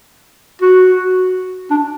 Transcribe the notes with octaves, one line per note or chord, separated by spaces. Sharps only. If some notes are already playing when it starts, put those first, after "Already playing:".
F#4
D4